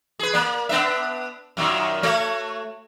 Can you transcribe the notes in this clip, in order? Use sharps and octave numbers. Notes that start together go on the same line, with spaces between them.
G#4 B4
A#3 D5
B3 D4 E5
F#2 A#2 D#3
A3 F#4 C#5